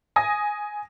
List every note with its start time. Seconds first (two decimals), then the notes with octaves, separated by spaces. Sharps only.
0.16 G#5 D#6 A#6